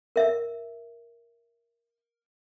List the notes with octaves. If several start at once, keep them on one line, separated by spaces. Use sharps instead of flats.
A#4 E5